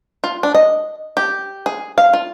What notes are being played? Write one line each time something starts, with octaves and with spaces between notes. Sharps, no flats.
F4
D4
D#5
G4
G#4
F5
F4